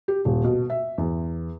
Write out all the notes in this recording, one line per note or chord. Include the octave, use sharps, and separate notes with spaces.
G4
D#1
B2
E5
E2